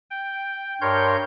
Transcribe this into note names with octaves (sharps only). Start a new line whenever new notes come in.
G5
G2 A#4 C#5 C6 G6